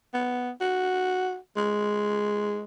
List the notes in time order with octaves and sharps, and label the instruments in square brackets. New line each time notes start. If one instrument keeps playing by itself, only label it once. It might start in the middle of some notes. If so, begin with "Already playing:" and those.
[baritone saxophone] B3
F#4
G#3